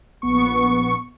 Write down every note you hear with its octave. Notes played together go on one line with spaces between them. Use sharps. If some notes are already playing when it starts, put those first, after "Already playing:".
A#1 B3 C#6